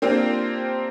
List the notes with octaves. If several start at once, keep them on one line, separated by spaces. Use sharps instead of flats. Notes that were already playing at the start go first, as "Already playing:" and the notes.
A#3 C4 D4 F4 G4